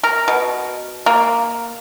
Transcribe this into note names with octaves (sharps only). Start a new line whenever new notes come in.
A#4
B2
A#3